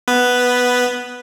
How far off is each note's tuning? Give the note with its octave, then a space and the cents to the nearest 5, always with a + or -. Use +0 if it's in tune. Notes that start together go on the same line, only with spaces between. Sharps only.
B3 +0 B4 +0